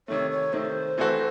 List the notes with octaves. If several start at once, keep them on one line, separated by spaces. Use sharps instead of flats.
C3 D#3 A3 C#5
C#5
C3 D#3 A3 C5
E3 A3 C4 F#4 A4